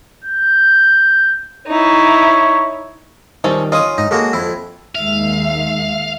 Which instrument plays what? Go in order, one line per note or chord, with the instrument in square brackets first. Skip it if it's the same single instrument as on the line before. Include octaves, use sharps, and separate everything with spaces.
[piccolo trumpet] G6
[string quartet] D#4 E4 [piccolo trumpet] C#5
[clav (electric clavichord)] D#3 G3 [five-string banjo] C4 C#4 A4
[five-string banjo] C#4 D#5 [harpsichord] F4 D#6
[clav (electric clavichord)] G#2 [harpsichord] D#4
[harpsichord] G#3 A#3 F#4 [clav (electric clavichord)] A4
[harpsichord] F2 E4
[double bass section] D#2 D#3 G#3 [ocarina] E5 [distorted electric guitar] F5